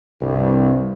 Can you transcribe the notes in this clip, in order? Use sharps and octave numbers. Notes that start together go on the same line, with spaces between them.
C2 G2